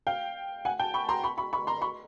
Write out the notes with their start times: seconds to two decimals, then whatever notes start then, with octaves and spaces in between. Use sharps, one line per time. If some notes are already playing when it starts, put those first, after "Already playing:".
0.07 F5 G5
0.65 F#5 G#5
0.79 G5 A5
0.94 B5 C#6
1.09 A#5 C6
1.23 B5 C#6
1.38 B5 C#6
1.53 B5 C#6
1.67 A#5 C6
1.81 B5 C#6